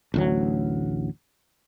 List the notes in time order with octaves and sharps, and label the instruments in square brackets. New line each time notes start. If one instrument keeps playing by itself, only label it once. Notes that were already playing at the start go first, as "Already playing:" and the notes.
[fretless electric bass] A1 D2 F#3